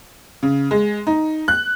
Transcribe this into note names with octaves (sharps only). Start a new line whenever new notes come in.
C#3
G#3
D#4
F#6